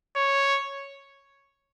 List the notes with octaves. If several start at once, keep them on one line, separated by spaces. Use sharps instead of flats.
C#5